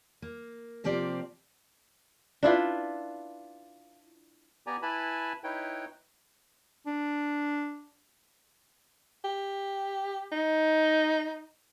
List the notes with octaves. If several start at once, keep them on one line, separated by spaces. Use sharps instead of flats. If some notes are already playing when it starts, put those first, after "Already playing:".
A#3
C3 F3 A#3 C4 G4 D5
D4 E4 F4 B4
B3 G4 D5 G#5 A#5
E4 B4 G#5 A5 B5
D#4 E4 B4 C#5 G5
D4
G4
D#4